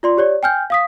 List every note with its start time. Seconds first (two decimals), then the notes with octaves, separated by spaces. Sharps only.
0.03 F4 D5 C6
0.17 G4 C#5 D5
0.43 G5 G#5 F6 G6
0.70 F5 D#6 B6